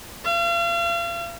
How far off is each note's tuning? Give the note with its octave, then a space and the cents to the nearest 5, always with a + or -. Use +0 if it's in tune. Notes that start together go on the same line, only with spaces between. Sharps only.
F5 -40